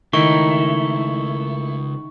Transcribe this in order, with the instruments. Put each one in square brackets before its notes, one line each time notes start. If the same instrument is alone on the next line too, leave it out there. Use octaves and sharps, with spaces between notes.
[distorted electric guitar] C#2 [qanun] D#3 [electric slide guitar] A3 E4 [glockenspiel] C#6